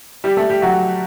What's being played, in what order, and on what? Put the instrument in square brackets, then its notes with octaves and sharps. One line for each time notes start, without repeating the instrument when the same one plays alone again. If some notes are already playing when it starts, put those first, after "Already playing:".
[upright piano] G3 G4
A3 A4
G3 G4
F#3 F#4